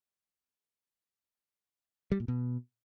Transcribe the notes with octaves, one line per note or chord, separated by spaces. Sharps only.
G3
A#2
B2